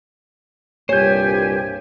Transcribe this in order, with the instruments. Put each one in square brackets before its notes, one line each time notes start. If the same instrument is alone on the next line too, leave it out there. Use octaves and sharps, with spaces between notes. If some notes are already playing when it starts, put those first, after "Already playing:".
[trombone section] C2 G2 A#2 [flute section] G4 G#5 [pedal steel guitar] C5 G6 [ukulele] C#5